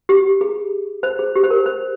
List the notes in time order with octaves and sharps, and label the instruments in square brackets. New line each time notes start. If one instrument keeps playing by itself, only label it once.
[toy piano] G4
G#4
C5
G#4
G4
C5
A#4
C5